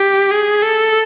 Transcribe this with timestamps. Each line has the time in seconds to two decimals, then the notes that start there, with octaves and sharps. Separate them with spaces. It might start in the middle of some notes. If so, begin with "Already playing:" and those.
Already playing: G4
0.31 G#4
0.63 A4